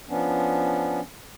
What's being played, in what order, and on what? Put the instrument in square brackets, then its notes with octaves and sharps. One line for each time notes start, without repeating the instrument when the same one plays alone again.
[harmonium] F3 B3 C#4 D4